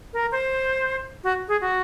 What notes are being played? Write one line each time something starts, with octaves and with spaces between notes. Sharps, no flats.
A#4
C5
F#4
G#4
F#4